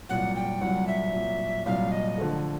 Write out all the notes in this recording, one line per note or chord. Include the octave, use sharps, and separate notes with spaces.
C2 A#2 F#3 F#5
G5
C2 A#2 F#3 F#5
E5
C2 A#2 F#3
C2 A#2 F#3 F5
D#5
D3 F3 A3